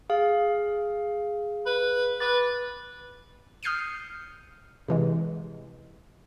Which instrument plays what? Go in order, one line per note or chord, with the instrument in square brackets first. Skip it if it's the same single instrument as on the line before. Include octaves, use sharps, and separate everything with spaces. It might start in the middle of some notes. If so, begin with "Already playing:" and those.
[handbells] G#4 F5
[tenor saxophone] B4
[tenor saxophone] B4 [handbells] D6 A6
[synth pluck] D#6 F6 G6 C7 C#7 D#7
C3 E3 G#3